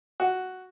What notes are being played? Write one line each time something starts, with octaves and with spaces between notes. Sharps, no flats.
F#4